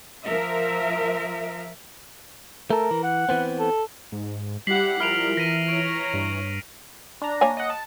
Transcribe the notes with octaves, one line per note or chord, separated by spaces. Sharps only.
F3 A#4 E5
A3 A4 A#4
E3
F#5
E3 B3 C4
A4
G#2
G3 E4 G4 F#5 B6 C7 F#7
F3 E4 A#4 F6 D7 F7
E3 A#6 B6 D#7
C#5 A#5 D7
G2
D4 A#5
A#3 C#5 G#5
D#5 F#5
A5